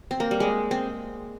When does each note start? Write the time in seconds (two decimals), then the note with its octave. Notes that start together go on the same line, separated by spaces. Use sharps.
0.11 C4
0.20 A#3
0.31 G3
0.40 G#3
0.71 C4